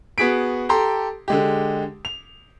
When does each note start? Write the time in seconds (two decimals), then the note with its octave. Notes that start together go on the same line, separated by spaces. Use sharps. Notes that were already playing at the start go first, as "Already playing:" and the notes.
0.18 B3 F#4 G#4 B6 D7
0.69 G4 A4 A#5 C6
1.28 D3 G#3 G4
2.05 F7